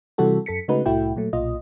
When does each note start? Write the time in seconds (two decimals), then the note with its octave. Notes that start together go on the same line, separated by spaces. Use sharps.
0.18 C3 E3 G3 F#4 A4
0.46 F#2 A4 B6 C#7
0.68 C#3 G#3 A3 D#4 F#4 B4
0.86 C2 A2 A3 E4 F#4 G5
1.16 A#2 F#3 A3
1.33 B1 A#2 F4 D#5